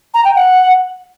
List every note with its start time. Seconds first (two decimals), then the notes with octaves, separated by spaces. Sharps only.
0.14 A#5
0.25 G5
0.35 F#5